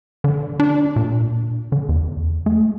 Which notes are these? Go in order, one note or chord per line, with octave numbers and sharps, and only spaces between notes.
D3
D4
A#2
D3
E2
A3